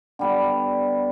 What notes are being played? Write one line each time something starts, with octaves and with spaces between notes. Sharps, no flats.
D3 G3 B3